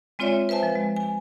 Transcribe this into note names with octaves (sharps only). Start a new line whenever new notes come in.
G#3 C4 F4 C#5 D5 E5
B4 C5 E5 G#5 A5
F3
G#3
G#5